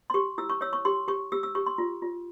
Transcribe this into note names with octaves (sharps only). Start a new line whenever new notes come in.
C6
G4 C#6
E4 E6
C#6
C#5 E6
C#6
G4 C6
G4 C#6
G4 E6
E6
G4 C#6
C6
F4
F4